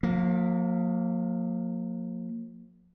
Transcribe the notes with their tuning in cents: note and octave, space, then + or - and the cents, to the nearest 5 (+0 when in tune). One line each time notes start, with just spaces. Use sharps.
F3 +45 A#3 -15